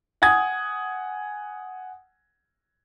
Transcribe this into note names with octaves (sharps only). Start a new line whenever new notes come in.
F#5 G#5 D#6 G#6